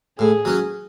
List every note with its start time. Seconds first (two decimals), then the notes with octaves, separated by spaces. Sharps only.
0.19 A2 G#4
0.45 F#3 C#4